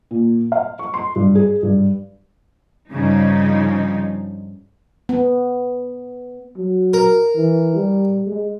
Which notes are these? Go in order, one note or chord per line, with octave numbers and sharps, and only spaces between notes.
A#2
F5
C#6
C6
G2
G#4
G2
G2 C#3 F3 D#4
B3
F#3
A#4
E3
G3
G#3